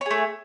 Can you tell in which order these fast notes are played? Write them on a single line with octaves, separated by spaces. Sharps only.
C#5 G#4 A3